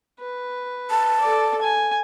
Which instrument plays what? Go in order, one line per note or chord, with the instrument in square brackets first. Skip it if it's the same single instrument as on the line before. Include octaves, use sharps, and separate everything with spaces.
[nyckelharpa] B4
[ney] A5
[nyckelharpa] A4 D5
G#5